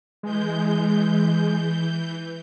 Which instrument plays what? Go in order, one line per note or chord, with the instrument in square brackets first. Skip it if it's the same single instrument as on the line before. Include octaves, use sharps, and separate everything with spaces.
[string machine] E3 G6 [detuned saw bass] G#3